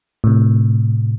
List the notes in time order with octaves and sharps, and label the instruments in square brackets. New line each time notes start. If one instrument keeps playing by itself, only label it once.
[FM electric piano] A2 C3